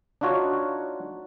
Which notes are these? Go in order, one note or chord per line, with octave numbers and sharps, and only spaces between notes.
D4 D#4 F4 F#4 C#5